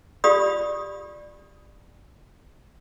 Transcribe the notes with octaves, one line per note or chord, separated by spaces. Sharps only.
F4 G4 D5 B5 D#6